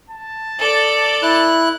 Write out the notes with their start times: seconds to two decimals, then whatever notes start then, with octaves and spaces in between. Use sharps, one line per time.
0.10 A5
0.59 A4 D5
1.23 E4 F#6